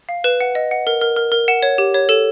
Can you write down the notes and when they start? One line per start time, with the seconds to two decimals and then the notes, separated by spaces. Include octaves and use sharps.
0.09 F5
0.24 B4 E7
0.41 F#5
0.55 D#5
0.71 F#5
0.87 A#4
1.01 A#4
1.16 A#4
1.32 A#4
1.48 F#5 E7
1.63 C#5
1.78 G4
1.94 C#5
2.09 A4 E7